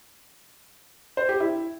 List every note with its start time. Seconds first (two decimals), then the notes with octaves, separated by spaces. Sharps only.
1.17 C5
1.29 G4
1.40 E4